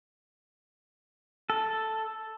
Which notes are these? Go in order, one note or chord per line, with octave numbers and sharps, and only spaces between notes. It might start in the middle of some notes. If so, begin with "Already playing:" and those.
A4